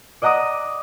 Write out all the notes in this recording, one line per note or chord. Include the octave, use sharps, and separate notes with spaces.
D5 D#5 F#5 A#5 D6 D#6